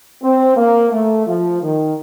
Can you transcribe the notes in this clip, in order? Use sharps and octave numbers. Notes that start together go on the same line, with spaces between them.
C4
A#3
A3
F3
D#3